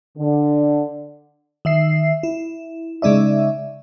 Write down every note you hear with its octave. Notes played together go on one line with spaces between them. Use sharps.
D3
D#3 E5 C7
E4
C#3 G#3 D#4 D5 E5